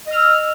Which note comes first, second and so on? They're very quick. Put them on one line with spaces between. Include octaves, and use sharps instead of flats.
D#5 F6 E6